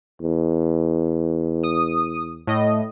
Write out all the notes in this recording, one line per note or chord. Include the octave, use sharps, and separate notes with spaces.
E2
D#6
A2 D#5